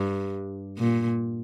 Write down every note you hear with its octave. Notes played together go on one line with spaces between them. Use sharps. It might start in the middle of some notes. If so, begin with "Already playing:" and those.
Already playing: G2
A#2